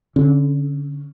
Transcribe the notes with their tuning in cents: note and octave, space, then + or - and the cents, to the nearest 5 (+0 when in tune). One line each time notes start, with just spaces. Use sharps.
D3 -30 C#4 -15